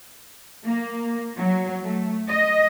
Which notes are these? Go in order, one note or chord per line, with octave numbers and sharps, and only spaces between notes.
A#3
F#3
A3
D#5